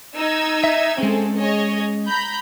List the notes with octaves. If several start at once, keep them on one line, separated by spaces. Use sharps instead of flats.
D#4 E6 G#6
E5
G#3 C4 C#4 G#4 A4
G#4 C#5 D#5
A#5 B5 G6